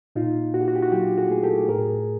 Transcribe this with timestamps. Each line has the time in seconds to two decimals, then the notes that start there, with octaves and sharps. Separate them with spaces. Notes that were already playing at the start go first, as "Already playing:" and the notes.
0.16 A#2 D#4 F4
0.54 A#2 F#4
0.61 G4
0.68 F#4
0.76 G4
0.82 E4 F#4
0.92 F#3 F4 G4
1.18 F#4 G#4
1.30 A3 G#4
1.43 G4 A4
1.68 A2 G#4 A#4